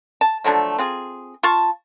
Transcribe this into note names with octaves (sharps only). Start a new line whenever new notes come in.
A5
D3 F3 F#3 A3
C4 F4 G#4
F4 A5 C#6